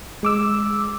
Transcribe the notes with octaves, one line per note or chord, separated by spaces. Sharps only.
G#3 D6 E6